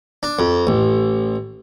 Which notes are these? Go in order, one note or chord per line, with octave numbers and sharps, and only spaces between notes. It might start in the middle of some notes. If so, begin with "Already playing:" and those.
D4
F2
A1